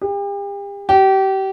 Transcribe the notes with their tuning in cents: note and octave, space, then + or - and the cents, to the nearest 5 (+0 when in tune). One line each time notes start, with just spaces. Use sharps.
G4 +40
G4 -30